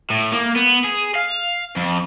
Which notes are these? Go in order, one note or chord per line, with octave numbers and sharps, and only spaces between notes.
A2
A#3
B3
G#4
F5
F2